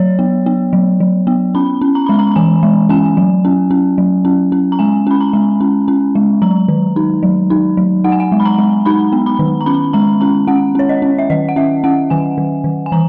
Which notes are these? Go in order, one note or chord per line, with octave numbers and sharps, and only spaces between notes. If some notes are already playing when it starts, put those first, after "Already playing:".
Already playing: F#3 C#5
B3
B3
F#3
F#3
B3
C#4 B5
C#4
A#5
G#3 B5
A#5
A#5
E3 G#5
G#3
C#4 G#5
F#3
C#4
C#4
F#3
C#4
C#4
A#5
G#3 G#5
C#4 B5
A#5
G#3
C#4
C#4
G#3
F#3 A#5
D#3
D#4
F#3
D#4
F#3
D#4 F#5
G#5
F#5
G#3
B5
A#5
G#3
D#4 B5
B3
B5
D#3
A#5
C#4 B5
G#3 A#5
C#4 A#5
C#4 F#5
C#4 C#5
D#5
C#4
E5
D#3 D#5
F#5
C#4 E5
C#4 F#5
D#3 G#5
D#3
D#3
G#5
E3 A#5